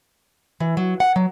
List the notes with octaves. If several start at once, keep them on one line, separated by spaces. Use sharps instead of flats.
E3
F#3
F#5
F#3